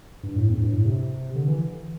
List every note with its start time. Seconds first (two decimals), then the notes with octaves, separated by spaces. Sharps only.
0.23 G2
0.36 A2
0.48 E2
0.54 A2
0.60 G2
0.73 A2
0.85 C3
1.35 D3
1.48 E3